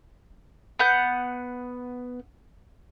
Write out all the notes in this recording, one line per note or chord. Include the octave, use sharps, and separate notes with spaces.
B3 F#5 G6